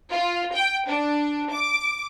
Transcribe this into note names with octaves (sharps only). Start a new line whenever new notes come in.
F4
G5
D4
D6